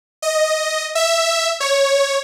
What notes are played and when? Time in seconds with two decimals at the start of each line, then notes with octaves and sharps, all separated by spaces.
0.22 D#5
0.95 E5
1.60 C#5